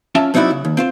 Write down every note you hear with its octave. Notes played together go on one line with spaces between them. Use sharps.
C#4 F4 E5 A5
F#3 C4 D#4 E4 F#4 D5
C#3
D#2
C4 F4 C5